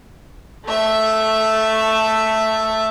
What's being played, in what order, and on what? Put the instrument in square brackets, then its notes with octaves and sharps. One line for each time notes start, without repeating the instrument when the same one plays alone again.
[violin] A3 E5